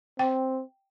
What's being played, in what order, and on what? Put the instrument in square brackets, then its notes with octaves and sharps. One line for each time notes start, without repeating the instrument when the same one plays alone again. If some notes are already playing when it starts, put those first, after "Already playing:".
[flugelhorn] C4 [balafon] G5